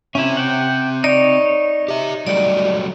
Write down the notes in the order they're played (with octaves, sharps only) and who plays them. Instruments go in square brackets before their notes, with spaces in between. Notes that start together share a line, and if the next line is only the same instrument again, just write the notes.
[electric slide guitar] C4 E5 [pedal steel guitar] C#4 E4
[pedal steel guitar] F#5 G5
[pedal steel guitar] D#4 C#5 [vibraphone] D5
[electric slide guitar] G4 E5
[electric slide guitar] F#3 G3 A3 [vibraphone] D5